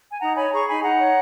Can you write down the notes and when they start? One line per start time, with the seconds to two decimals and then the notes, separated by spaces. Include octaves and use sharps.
0.11 G#5
0.20 D#4 F#5 A#5
0.36 C#5 G#5 B5
0.52 G#4 A#5 C#6
0.68 D#4 G#5 B5
0.83 D#4 F#5 A#5
1.00 C#5